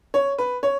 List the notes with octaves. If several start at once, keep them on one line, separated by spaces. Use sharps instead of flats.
C#5
B4
C#5